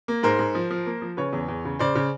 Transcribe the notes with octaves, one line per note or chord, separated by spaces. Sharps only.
A#3
G#2 A#4 C5
G#2
F3
F3
A#3
F3
C#3 B4 C#5
E2
E2
C#3
C#3 C5 D5
C#3